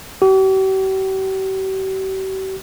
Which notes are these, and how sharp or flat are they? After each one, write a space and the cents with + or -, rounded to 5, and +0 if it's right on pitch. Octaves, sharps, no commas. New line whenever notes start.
G4 -45